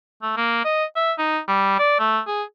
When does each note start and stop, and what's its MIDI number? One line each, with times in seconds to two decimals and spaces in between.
0.22 0.32 57
0.37 0.63 58
0.65 0.85 75
0.96 1.12 76
1.18 1.39 63
1.48 1.75 55
1.79 1.95 74
1.99 2.20 57
2.27 2.43 68